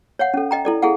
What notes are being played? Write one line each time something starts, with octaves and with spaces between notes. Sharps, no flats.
C#5 F5 F#5
C#4 A4
D#5 G5 A#5
E4 A4 D5
E4 G#4 A4 F5 F#5